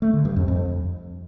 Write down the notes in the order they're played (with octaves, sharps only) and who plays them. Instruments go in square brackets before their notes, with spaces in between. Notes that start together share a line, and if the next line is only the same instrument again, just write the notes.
[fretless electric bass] A3
D3
G2
F2
F2